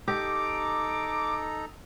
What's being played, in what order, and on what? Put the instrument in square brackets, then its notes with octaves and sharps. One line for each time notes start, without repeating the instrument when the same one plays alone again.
[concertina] D#4 A4 A#5 [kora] G4 [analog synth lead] D6